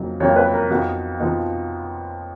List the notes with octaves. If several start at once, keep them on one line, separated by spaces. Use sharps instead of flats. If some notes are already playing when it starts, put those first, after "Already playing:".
Already playing: F2 C#3 F#3 A#3 D#4
F2 C#3 F#3 A#3 D#4 C#5
B4
A#4
F2 F3 B3 D#4 F#4
F2 F3 B3 D#4